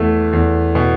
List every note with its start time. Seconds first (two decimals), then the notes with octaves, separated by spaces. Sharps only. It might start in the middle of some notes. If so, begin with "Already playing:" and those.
Already playing: E2 A3
0.33 E2
0.75 B2